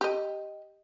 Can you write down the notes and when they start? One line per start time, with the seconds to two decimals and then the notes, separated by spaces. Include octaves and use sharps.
0.01 G4 D#5